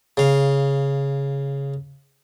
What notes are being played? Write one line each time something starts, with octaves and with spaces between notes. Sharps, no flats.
C#3 F5